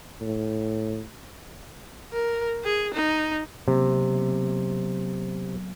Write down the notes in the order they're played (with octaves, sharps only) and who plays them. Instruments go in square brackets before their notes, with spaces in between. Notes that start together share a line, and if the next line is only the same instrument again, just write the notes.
[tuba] A2
[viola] A#4
G#4
D#4
[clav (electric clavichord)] C3 [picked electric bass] F#3 A#3 B3